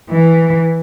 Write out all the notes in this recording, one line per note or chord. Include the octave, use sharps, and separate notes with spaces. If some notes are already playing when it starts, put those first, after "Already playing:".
E3